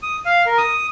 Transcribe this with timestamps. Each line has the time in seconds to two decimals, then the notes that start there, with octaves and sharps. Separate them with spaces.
0.02 D#6
0.26 F5
0.46 A#4
0.58 D#6